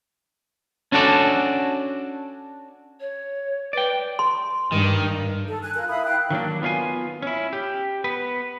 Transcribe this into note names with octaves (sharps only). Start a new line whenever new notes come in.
C#4 D4 F#4 A4 D5
C#5
B4 D5 G5
C6
G2 D#3
A4
G#5 F#6
F4 A#4 F#6
E4 F5 B5 D#6
F5 G5 F#6
D#3 F#3 A#3 D4
B3 F4 C#5 F5 G#5
C#4 E4
G4
B3 B4